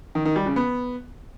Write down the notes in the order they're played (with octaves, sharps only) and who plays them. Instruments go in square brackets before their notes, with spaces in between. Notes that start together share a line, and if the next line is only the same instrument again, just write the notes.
[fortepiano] D#3
D#3
G3
C#3
B3